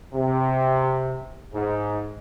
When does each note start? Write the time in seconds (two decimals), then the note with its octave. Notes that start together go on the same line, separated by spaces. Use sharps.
0.14 C3
1.54 G#2